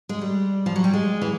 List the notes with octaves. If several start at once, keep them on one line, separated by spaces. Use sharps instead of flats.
G#3
G3
F3
F#3
G3
G#3
E3